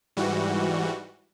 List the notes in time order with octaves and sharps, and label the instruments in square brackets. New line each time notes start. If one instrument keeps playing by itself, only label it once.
[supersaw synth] G#2 E3 G3 F#4